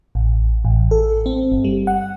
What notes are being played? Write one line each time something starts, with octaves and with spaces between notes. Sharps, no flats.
A1
A1
A4
C4
G1
G3
F#5